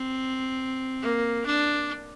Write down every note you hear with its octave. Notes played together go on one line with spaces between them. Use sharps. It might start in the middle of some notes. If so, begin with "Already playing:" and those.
Already playing: C4
A#3
D4